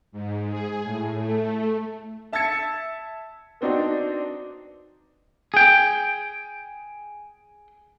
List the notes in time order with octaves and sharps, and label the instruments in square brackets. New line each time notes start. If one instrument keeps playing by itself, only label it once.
[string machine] G#2
G#4
A2
A3
[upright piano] E5 A5 E6 G#6 A6 C#7
B3 C4 D4 D#4 F#4
[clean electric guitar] G#4 G5